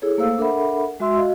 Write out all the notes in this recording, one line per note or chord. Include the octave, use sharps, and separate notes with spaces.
E4 G#4 A4 C#5
A3 A#3 A4 C5 F5 E6
D4 A4 A#4 E5 F#5 B5
G#3 F#4 E5 C6 E6
F#4 D#5 F5